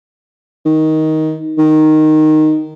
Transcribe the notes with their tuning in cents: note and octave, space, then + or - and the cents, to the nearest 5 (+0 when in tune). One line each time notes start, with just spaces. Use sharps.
D#3 +15
D#3 -5